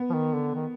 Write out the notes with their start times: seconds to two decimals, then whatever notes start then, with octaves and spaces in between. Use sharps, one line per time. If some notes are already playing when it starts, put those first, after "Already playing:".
Already playing: B3
0.09 F3
0.13 D#3
0.34 D3
0.54 D#3